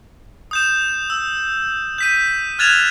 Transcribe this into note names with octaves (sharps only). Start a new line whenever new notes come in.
D#6 G6 E7
E6
G6 B6 D#7
F6 F#6 G#6 A6 E7 F7